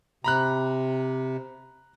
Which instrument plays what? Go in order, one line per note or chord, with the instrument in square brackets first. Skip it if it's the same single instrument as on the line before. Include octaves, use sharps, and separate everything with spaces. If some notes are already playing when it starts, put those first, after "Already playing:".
[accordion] C3 [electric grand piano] A#5 B5 F#6